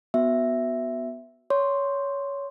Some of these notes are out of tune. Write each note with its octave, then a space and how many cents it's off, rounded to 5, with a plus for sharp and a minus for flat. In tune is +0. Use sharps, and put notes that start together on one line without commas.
B3 +0 F#4 +0 E5 +0
C#5 +15 C6 +0